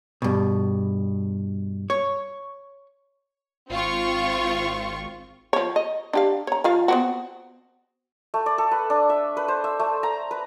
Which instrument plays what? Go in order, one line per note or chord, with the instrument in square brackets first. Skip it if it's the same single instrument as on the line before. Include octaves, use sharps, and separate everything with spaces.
[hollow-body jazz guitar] G2 B2
C#5
[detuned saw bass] G#1 [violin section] C4 F4 C#6
[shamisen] F3 C#5
D#5
D4 G4 F5
C#5 A#5
F3 F4 F5
B3 C4 F#4
[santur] A3
D5
A4
B4
D4
E5
B4
C5
E5
A3
A#5
B4